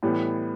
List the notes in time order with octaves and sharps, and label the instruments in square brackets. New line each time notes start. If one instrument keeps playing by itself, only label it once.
[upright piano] A2 E3 G3 B3